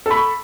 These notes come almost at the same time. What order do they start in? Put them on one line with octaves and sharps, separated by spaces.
A4 B5 C#6